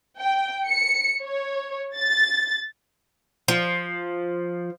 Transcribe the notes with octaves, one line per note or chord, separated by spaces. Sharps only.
G5
C#7
C#5
A6
F3